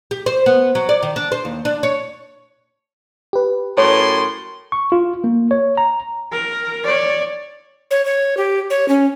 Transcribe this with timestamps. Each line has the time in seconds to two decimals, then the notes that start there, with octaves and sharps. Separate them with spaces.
0.11 G4
0.26 C5
0.46 B3
0.75 F#3
0.89 D5
1.03 D#3
1.16 D4
1.32 C5
1.45 D#2
1.65 D4
1.83 C#5
3.33 G4 B4
3.78 F#2 A2 C#5 C6
4.72 C#6
4.92 F4
5.24 A#3
5.51 C#5
5.77 A#5
6.32 A#4
6.85 C#5 D5
7.91 C#5
8.05 C#5
8.37 G4
8.70 C#5
8.88 C#4